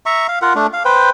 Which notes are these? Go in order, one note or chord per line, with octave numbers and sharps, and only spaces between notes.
E5 A#5 C#6
F5
F4 A#4 F#5
A3 D4
F5
B4 C5 G5